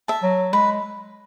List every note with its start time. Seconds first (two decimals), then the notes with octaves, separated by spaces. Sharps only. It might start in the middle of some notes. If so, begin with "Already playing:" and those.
0.08 E5 A5
0.23 F#3
0.53 G#3 B4